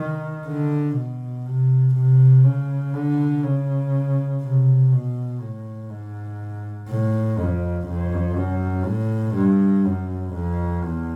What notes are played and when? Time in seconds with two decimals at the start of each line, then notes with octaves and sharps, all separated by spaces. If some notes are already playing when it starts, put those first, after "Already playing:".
Already playing: D#3
0.47 D3
0.96 B2
1.46 C3
1.95 C3
2.45 C#3
2.94 D3
3.43 C#3
4.42 C3
4.92 B2
5.40 A2
5.90 G#2
6.89 A2
7.38 F2
7.88 F2
8.37 F#2
8.86 A2
9.35 G2
9.85 F#2
10.34 F2
10.84 E2